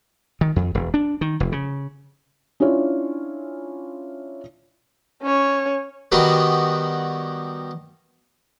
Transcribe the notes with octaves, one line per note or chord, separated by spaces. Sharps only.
D#3
F2
E1
D4
D#3
F1
C#3
C#4 D4 E4 F4 C#5
C#4 C#5
D#3 G3 B3 F#4 A#4 B4